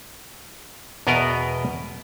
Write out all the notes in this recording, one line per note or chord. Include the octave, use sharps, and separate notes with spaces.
E2 B2 B3 A#4 D5 D#5